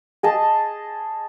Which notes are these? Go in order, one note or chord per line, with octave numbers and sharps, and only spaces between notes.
G#4 D#5 A5